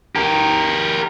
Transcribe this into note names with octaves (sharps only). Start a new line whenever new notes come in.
G4 A#4